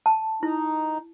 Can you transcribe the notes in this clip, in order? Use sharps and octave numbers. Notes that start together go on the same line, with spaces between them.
A5
D#4 E4